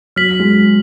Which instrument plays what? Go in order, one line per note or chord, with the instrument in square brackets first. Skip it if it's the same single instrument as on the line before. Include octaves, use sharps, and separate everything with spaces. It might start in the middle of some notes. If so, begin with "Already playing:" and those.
[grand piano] F#3 [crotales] F6 B6 F#7
[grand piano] G#3